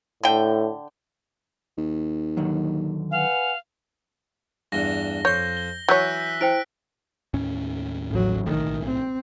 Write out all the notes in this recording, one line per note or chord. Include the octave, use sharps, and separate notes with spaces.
A2 D3 G5
D#2
D3 D#3 F#3
B4 F5 F#5 G#5
E2 G2 A#6 G7
F2 C#5 C6 G6
G7
E3 F#3 C#5 E6 F#6 G6 B6
E4 C5 G5 D7
D#2 A2 C#4
A1 F#3
B1 A2 D#3
C4